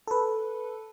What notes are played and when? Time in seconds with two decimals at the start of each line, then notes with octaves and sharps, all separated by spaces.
0.08 A4 B4